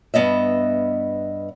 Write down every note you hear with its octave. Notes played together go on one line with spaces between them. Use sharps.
G2 B3 D#5 E5